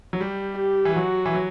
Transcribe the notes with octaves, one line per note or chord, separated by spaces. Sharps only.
F#3
G3 G4
G4
E3
F#3 F#4
E3
F#3